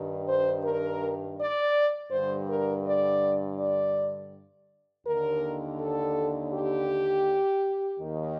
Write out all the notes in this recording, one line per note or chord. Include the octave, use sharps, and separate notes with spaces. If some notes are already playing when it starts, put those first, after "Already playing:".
Already playing: G2 D#3
C5
A#4
D5
G2 D3 C5
A#4
D5
D5
D#2 D3 A#4
A4
G4
D#2 D#3